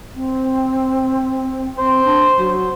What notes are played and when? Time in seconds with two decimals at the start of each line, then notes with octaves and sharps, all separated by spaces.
0.15 C4
1.78 C4 C5
2.04 D4
2.36 F#3